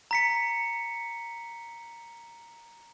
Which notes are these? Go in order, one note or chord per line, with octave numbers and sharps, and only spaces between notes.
A#5 B6 C#7